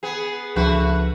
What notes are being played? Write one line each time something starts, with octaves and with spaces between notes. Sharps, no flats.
B3 G#4
C#2 F3 A3 D4 F#4 B4